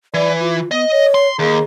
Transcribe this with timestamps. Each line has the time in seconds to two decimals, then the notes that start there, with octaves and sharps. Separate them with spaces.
0.14 E3 D5
0.41 F4
0.71 B3 D#5
0.92 C#5
1.14 C6
1.39 D#2 G#4